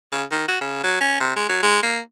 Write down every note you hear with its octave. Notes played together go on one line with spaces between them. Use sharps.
C#3
D#3
F#4
C#3
F#3
C#4
C3
G#3
F#3
G#3
A#3